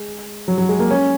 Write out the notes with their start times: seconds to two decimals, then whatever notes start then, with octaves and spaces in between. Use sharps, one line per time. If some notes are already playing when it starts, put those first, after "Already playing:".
Already playing: G#3
0.48 F#3
0.58 F#3
0.69 G#3
0.79 A#3
0.90 C#4